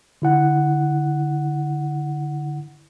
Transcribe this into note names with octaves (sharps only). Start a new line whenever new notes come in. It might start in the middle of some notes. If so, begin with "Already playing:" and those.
D3 E4 F#5